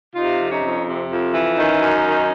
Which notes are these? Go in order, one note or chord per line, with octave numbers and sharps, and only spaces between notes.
C3 D#4 F4
F2
C#4 D#4
F2
C3
F2
E3
D#3 C#4 D#4
F#2
D#3